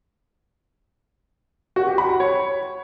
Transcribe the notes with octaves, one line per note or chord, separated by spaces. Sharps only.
F#4
G4
B5
F#5
C#5